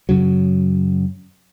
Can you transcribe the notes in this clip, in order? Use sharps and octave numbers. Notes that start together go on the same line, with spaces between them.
F#2 C#3 F#3